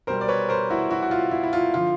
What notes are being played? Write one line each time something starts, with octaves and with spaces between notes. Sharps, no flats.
B2 G3 A#4 C5
D5
B4 C#5
A#4 C5
E4 F#4
E4 F#4
F#4
F4
E4
E4
F4
D3 F3 F4